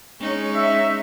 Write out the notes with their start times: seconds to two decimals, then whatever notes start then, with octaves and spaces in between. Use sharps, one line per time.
0.21 G#3 C#4 D#4
0.54 E5